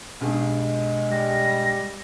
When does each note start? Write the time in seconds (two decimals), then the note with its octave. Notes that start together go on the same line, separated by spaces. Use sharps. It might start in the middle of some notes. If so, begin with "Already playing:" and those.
0.20 B1 G2 G#3 G#4
1.11 G3 A#6